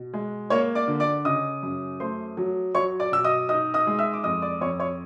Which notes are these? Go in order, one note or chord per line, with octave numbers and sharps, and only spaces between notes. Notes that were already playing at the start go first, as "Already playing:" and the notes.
Already playing: B2
G#3
A#3 C#5 C#6
D5 D6
D3
D5 D6
C#3 D#5 D#6
F#2
A3 C5 C6
F#3
F#3 C#5 C#6
D5 D6
B2 E6
D#5 D#6
D#4 D#5 D#6
D#5 D#6
G#3
E5 E6
D6
F2 D#5 D#6
D5 D6
F2 C#5 C#6
C#5 C#6